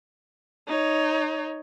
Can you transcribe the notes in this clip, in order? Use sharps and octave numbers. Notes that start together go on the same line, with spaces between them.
D#4 C#5